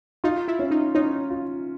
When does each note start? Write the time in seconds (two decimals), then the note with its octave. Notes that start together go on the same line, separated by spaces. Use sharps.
0.24 D#4 F4
0.48 E4
0.59 C#4
0.71 D#4
0.95 C#4 D#4
1.30 F4